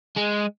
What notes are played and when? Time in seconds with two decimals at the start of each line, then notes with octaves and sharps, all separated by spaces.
0.17 G#3